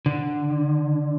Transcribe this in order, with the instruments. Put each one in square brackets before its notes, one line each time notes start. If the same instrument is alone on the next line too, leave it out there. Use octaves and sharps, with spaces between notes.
[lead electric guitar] D3